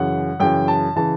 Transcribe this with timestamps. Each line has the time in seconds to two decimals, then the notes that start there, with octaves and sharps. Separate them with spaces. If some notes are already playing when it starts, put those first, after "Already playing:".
Already playing: F#2 C#3 E3 F#5
0.40 F#2 C#3 E3 G5
0.68 A5
0.96 C#3 E3 A5